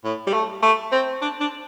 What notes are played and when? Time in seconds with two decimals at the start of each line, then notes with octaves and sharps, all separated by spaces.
0.04 A2
0.27 G3
0.34 A3
0.63 A3
0.92 C4
1.22 D4
1.41 D4